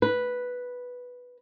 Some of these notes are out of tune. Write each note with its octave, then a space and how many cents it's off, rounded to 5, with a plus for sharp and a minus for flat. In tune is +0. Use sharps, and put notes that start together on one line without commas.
B4 -5